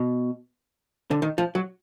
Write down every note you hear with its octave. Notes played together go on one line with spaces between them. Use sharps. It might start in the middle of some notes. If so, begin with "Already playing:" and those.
Already playing: B2
D3
D#3
F3
F#3